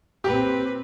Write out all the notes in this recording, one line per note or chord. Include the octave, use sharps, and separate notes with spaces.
A#2 C4 G4 B4